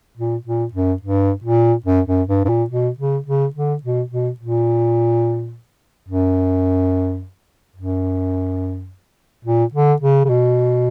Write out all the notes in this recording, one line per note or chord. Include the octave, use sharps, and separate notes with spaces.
A#2
A#2
F#2
G2
A#2
F#2
F#2
G2
G2
A#2
B2
C#3
C#3
D3
B2
B2
A#2
F#2
F#2
A#2
D3
C#3
C#3
B2